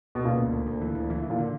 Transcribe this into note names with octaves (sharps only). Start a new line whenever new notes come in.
B2
A#2 C#3
D2
D2
D2
E3
D2
E3
E3
A#2
D3